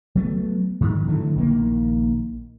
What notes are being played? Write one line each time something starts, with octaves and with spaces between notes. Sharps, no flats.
F#3 A3 B3
G#2 D#3
D3 E3 F#3 A3
A#1 D#3 A#3